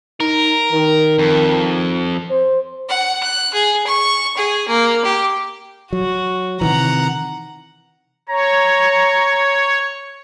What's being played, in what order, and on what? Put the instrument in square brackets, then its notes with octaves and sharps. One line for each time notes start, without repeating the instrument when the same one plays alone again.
[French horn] D#4 [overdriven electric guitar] A#4
[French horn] D#3
[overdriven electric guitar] F2
[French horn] C5
[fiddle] F#5
F#6
G#4
C#6
G#4
A#3
G4
[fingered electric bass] F#3 [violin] F#4
[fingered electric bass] C3 D#3 E3 [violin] F#5 A#5
[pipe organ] C#5 [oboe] A#5